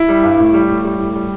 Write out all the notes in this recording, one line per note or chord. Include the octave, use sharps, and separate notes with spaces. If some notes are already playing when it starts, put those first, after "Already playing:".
Already playing: E4
G3
G2
A2
G3
A2
G3
A2
G3